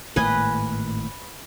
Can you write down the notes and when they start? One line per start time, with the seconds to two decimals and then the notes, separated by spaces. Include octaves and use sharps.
0.16 G#1 A2 A#3 B4 D#5 G#5